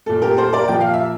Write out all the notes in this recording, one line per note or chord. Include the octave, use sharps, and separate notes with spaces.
A#2 A3 A4
G4 A#4
A4 C5
A#4 D5
A#2 F3 A#3 G5
F5
E5